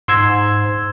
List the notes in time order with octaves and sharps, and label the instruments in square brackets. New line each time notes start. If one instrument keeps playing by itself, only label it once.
[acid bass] G#2 [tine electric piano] C6 E6 G#6